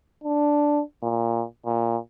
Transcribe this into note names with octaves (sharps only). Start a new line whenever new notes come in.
D4
A#2
A#2